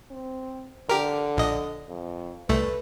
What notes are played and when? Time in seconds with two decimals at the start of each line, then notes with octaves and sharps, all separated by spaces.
0.11 C4
0.89 D3 G4 A#4
1.37 A#1 D#5
1.88 F2
2.49 C2 A3 B4